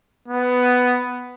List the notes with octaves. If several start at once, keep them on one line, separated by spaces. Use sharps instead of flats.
B3